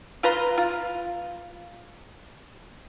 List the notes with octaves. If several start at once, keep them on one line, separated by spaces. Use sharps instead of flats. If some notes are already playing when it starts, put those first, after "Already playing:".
F4 B4 A#5 C6
F4